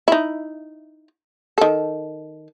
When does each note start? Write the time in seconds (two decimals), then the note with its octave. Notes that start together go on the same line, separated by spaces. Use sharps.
0.08 D#4 E4
1.58 D#3 A4